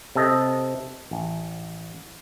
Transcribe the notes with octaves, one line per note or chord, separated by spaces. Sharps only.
C3 A4 D#5
A1